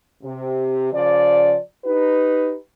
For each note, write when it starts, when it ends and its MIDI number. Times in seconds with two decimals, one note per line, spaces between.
0.23 0.90 48
0.92 1.56 49
0.92 1.56 53
0.92 1.56 74
1.85 2.56 63
1.85 2.56 67
1.85 2.56 71